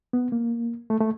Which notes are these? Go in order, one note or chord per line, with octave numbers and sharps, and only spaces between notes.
B3
A#3
A3
A3